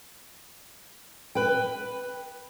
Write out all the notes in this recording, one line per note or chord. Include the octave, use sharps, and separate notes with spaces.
B4 G5